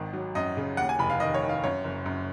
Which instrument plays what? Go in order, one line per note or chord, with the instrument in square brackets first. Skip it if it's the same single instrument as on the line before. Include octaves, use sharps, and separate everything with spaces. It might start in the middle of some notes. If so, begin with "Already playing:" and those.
Already playing: [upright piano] G#1 D#3
F#3
F#2 D#5
C#3
D#2 F#5
G#5
F1 B5
F5
D#3 D#5
C#5
D#3
F5
F#2 C#5
F#1
F#2